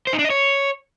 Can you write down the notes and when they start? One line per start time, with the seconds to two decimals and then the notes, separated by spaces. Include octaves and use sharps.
0.07 C5
0.13 D#4
0.19 D4
0.24 D#5
0.30 C#5